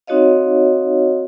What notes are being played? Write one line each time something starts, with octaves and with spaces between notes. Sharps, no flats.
C4 D#4 F#4 C#5 D#5 F5